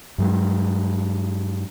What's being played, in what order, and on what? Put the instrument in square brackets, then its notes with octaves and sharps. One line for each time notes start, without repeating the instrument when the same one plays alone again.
[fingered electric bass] G2 F#3 G#3